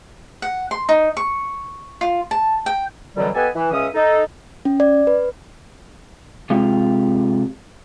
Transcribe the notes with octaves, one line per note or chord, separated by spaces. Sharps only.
F#5
C6
D#4
C#6
F4
A5
G5
F#2 B2 D3 E3 F#3 G3
B3 G4 A4 B4 D#5 G#5
E3
C#2 C#3 C#4 E5 D#6
D#4 A4
C#4
D5
B4
C3 G#3 F4 G4